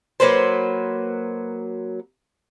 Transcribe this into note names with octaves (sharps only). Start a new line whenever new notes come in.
F#3 A#3 B4 C5